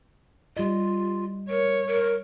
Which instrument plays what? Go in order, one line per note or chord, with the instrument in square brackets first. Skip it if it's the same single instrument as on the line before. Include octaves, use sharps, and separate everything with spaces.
[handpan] G3 D#5 [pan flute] F4
[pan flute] A#4 [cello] C#5
[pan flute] A#4